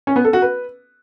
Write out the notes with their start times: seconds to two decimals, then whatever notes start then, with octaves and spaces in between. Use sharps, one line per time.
0.07 C#4
0.16 B3
0.25 A4
0.33 F#4
0.42 B4